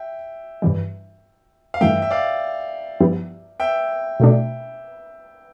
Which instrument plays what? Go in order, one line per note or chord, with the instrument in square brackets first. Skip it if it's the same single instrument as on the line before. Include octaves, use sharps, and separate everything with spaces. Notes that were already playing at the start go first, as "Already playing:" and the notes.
Already playing: [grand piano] E5 G5
[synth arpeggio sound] G2 E3 G3
[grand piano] F5
[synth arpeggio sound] G2 E3 A3 [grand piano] E5 G5
[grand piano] E5
D5 F5
[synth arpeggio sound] G2 F3 B3 E4 G4
[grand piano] E5 G5
[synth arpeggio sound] B2 A3 D4